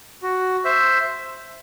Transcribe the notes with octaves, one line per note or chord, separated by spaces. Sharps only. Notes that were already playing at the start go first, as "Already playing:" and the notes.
F#4
C5 E5